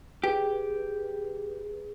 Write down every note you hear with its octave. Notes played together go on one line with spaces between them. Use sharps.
G4 G#4 B4